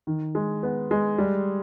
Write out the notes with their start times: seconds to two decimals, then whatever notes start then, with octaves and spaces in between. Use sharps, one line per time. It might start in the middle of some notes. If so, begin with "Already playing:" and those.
0.07 D#3
0.35 G#3
0.63 B3
0.91 G#3
1.18 G3